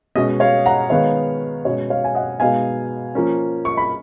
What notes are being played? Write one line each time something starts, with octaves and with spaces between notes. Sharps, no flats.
B2 G#3 C#4 D#5
C#5 F5
F#5 A#5
D#3 G#3 B3 D#4 C#5 F5
B2 G#3 C#4 C#5
C#5 F5
G#5
D#5 F#5
B2 G#3 B3 D#4 F5 G#5
F3 A#3 C#4
C#6
B5